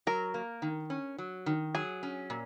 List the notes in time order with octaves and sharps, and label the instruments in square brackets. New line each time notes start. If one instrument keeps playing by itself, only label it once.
[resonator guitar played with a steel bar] F#3 [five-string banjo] A#4
[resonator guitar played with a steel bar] A#3
D#3
C#4
F#3
D#3
[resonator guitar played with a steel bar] F#3 [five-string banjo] G#4
[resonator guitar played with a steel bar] C#4
A#2